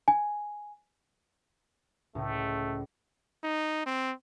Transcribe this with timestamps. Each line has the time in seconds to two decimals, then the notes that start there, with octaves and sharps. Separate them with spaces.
0.08 G#5
2.15 C#2 A2 A3
3.44 D#4
3.86 C4